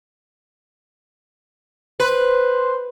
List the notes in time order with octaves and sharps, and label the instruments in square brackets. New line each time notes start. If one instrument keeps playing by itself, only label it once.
[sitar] B4 [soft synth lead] C5